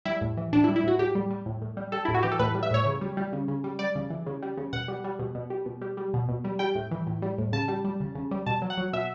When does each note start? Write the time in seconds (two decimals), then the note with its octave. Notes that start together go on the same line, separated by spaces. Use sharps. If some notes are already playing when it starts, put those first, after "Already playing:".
0.05 G3 E4
0.21 A2
0.37 E3
0.53 A2 D4
0.64 E4
0.68 G3
0.76 E4
0.84 A2 F#4
0.99 A2 G4
1.15 G3
1.30 G3
1.46 A2
1.62 A2
1.77 G3
1.92 G3 A4
2.05 A2 E4
2.14 F#4
2.23 E3 G4
2.32 A4
2.39 A2 B4
2.55 G3
2.63 E5
2.71 A2 C#5
2.86 C#3
3.01 G3
3.17 G3
3.33 C#3
3.48 C#3
3.64 G3
3.79 G3 D5
3.95 C#3
4.10 E3
4.26 C#3
4.42 G3
4.57 C#3
4.73 B2 F#5
4.88 G3
5.04 G3
5.19 B2
5.35 B2
5.50 G3
5.66 B2
5.81 G3
5.97 G3
6.14 B2
6.29 B2
6.44 G3
6.59 G3 G5
6.75 A2
6.91 E3
7.07 A2
7.22 G3
7.38 A2
7.53 C#3 A5
7.68 G3
7.84 G3
8.00 C#3
8.15 C#3
8.31 G3
8.46 B2 A5
8.62 F#3
8.70 F#5
8.78 F#3
8.93 B2 E5